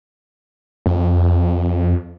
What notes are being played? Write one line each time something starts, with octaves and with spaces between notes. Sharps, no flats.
F2